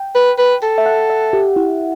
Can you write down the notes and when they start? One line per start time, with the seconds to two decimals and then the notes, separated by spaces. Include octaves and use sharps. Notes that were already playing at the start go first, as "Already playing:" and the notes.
Already playing: G5
0.15 B4
0.39 B4
0.63 A4
0.78 E5
0.86 F#5
1.10 E5
1.33 G4
1.56 E4